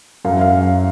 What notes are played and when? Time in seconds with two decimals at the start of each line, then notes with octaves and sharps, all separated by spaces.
0.25 F#2 F5
0.34 E5
0.41 F5